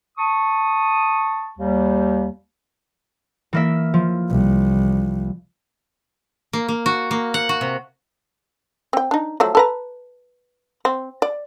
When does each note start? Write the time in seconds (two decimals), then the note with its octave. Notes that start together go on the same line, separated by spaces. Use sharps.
0.17 A5 C#6 D#6
1.58 D#2 G3
3.53 E3 A#3 E5
3.94 F3
4.30 C2
6.53 A#3
6.69 A#3
6.86 F#4
7.11 A#3
7.34 F#5
7.49 F#4
7.61 C3
8.93 C4 G5
9.11 D4 D#4
9.40 F3 F#3 A3
9.55 A4 B4 A#5
10.85 C4
11.22 D5